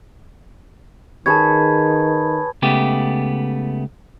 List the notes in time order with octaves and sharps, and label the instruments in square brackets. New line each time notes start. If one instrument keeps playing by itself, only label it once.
[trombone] D#3 [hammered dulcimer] G#4 B4 C#5 [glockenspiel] A5 G#6
[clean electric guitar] C#2 C#3 A3 B3 G4